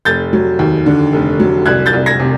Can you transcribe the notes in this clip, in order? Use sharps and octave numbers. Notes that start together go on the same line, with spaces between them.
F1 G6 A6
F#3
D#2
D3
F1
F#3
C2 F#6 G#6
G6 A6
C2
G#6 A#6
C3